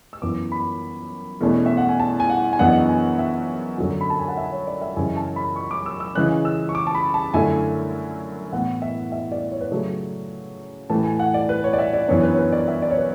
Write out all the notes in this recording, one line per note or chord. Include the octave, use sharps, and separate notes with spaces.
E6
F#2 E3 B3 D6
B5
E2 B2 A3 C#4
E5
F#5
G#5
A5
G#5
F#5
G#5
F#2 E3 G#3 B3 D4 F#5
G#5
E5
F#2 D3 F#3
B5
A5
G#5
F#5
E5
C#5
D5
E5
F#2 C#3 E3 G#3 C#4 G#5
A5
B5
C#6
D6
E6
E6
C#3 E3 G#3 C#4 F#6
E6
C#6
D6
A5
B5
A5
F#2 D3 A3 E4 G#5
A2 E3 B3 F#5
E5
E5
D5
C#5
B4
C#3 F#3 A3 C#5
A2 E3 A3 A5
G#5
F#5
D5
B4
C#5
D5
E5
D5
F#2 E3 B3 D4 C#5
B4
C#5
B4
D5
E5
D5
C#5
B4